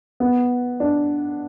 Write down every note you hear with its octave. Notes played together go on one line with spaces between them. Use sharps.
B3
D4